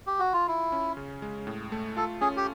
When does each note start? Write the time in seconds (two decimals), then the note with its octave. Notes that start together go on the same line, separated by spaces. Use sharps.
0.07 G4
0.19 F#4
0.33 F4
0.47 E4 F4
0.72 C#4
0.97 C#3
1.22 G#3
1.47 A2
1.72 A3
1.97 F4 A4
2.21 C#4 G#4
2.37 G4